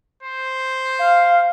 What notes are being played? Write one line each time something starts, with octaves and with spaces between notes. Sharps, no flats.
C5
F5